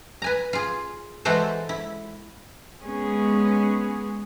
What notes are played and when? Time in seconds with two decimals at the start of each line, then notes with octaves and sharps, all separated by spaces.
0.22 B4 G#5 A#5
0.53 F4 G#4
1.25 E3 G#3 E4 F#4 A4 C5
1.69 E4
2.83 G#3 B3 C#4 G#4